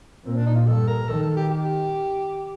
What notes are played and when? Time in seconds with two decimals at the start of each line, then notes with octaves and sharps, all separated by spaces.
0.25 A#2 C4
0.36 D4
0.47 D#4
0.56 F4
0.67 G2 A4
0.88 A#4
1.08 D#3 A4
1.23 A4
1.37 G4
1.50 G4